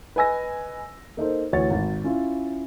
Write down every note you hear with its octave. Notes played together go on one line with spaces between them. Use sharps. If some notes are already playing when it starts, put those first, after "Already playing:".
B4 D#5 G#5 E6 A#6
A#3 D#4 A4 C5
D2 E3 C#5 A6
G#1
C#4 E4 F4